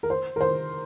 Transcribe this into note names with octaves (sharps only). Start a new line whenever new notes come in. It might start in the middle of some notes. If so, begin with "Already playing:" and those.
A#4
C5
A#4
C5